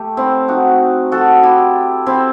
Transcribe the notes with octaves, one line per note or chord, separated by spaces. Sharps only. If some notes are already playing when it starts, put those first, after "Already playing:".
Already playing: A3 G4
C4 E4
D#4 F#4
F#4 A4
E4 G4
C4 E4